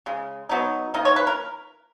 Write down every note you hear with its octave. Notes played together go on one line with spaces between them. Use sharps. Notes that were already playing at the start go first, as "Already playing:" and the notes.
C#3 G#3
B2 F#3 B3 D#4
D#3 A#3 D#4 D#5
C#5
B4
A#4